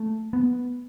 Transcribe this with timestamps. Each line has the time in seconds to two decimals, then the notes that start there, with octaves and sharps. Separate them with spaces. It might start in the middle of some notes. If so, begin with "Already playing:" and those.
Already playing: A3
0.33 B3